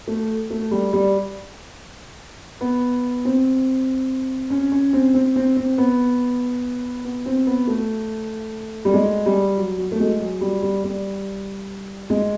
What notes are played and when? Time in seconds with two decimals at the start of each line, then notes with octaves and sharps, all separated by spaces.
0.08 A3
0.50 A3
0.71 G3
0.93 G3
2.61 B3
3.25 C4
4.50 C#4
4.72 C#4
4.93 C4
5.14 C4
5.36 C4
5.56 C4
5.78 B3
7.05 B3
7.26 C4
7.47 B3
7.67 A3
8.85 G3
8.94 G#3
9.26 G3
9.57 F#3
9.78 F#3
9.92 A3
10.00 G#3
10.20 F#3
10.41 G3
10.63 G3
10.84 G3
12.10 G#3